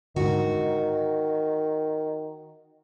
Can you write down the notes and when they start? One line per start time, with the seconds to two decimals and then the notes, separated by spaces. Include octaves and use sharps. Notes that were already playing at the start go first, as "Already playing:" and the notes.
0.16 G#2 D3 D#3 F#4